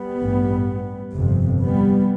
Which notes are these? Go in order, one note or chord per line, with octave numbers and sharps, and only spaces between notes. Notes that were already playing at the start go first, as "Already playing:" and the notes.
Already playing: G3 B3
A1 G2
G1 F2 C3
G3 B3